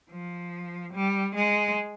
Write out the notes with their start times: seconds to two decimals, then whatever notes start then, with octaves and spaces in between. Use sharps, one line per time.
0.10 F3
0.93 G3
1.35 G#3